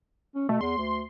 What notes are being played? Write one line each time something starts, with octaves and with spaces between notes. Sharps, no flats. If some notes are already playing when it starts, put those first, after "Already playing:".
C#4
B2 A3
E2 C6
D2